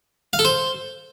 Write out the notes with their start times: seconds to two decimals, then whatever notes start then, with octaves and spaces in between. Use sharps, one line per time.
0.33 F5
0.39 A4
0.45 C5